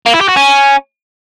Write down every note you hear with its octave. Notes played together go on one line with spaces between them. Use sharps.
A#3
E4
G4
F#4
C#4